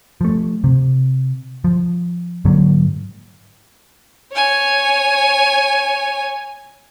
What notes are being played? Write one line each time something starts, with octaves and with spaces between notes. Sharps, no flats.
F3 A3
C3
F3
G#2 D3 F#3 A#3
C#5 G#5